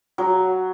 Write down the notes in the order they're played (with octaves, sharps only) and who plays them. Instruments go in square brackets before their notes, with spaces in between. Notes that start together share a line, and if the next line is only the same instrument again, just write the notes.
[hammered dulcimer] F#3